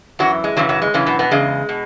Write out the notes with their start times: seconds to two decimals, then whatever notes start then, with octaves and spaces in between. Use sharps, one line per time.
0.19 F#2 E3 F#3 F#4
0.44 G#3
0.57 F#2 C#3 E3 F#3
0.69 F#3
0.82 G#3
0.94 F#2 C#3 E3 C#4
1.06 B2 B3
1.19 B2 B3
1.31 E2 C#3 G#3
1.69 B2